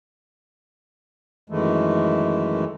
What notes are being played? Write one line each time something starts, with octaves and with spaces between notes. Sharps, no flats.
F#2 D#3 E3 G#3 A3